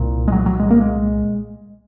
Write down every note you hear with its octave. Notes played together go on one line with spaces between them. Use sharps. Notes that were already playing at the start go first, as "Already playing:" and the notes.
Already playing: C2 A#2
G#3
F#3
F#3
G#3
A#3
G#3